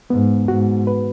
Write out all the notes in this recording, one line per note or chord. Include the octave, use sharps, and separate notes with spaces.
G#2 B3
G#2 F#4
B4